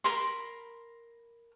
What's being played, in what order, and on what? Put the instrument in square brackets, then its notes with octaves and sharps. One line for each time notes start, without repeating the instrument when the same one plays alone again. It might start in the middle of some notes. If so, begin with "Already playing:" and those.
[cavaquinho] A#4 B5 C6